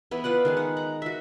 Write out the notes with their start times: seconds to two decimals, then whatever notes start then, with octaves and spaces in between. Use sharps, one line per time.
0.11 E3 B3 E4
0.24 F4 B4 D5 F#5
0.45 D#3 G#3 F5
0.57 F#5
0.77 F#5 A#5
1.02 F#4 E5